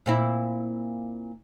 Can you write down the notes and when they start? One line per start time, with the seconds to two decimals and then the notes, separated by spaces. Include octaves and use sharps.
0.06 A#2 C4 E4